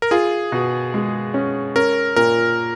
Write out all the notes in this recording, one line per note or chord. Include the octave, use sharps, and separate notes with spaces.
A#4
F4 G#4
B2
G#3
C#4
C#4 A#4
A#2 A#4